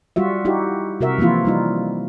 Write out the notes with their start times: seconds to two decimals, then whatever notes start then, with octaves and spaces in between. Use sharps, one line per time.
0.16 G3 F4 F#4 E5
0.45 D#4 E4 F#4 G4
1.00 C3 F#4 A#4 E5
1.18 E3 F3 A#3 E4 F4
1.45 G3 D#4 F4